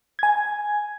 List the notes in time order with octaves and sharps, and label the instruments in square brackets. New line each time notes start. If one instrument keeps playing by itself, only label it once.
[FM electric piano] G#5 G#6